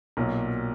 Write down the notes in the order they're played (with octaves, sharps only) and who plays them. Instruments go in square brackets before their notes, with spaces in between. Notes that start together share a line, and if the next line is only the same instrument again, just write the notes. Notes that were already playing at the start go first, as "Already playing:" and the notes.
[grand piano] B1 A#2 F#3